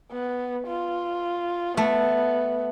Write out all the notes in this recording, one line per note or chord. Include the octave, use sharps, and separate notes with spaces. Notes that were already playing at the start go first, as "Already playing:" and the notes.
B3
F4
A3 B3